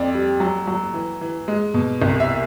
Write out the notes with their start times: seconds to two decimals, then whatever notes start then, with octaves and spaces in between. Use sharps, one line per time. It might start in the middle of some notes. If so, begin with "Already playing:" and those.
Already playing: F2 D5
0.14 G3
0.40 F#3
0.67 F#3
0.94 E3
1.21 E3
1.48 G#3
1.74 B2
2.02 C2
2.20 E5